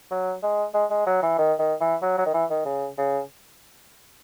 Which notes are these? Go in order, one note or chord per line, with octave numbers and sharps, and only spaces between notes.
F#3
G#3
G#3
G#3
F#3
E3
D#3
D#3
E3
F#3
F#3
D#3
E3
D#3
C#3
C#3